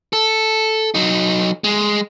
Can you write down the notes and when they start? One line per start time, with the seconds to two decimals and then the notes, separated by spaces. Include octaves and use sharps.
0.13 A4
0.94 F#3 D#4
1.64 G#3